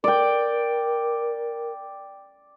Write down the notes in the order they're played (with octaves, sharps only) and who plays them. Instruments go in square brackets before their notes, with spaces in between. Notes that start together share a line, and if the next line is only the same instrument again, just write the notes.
[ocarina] A#4 [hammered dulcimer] D5 G5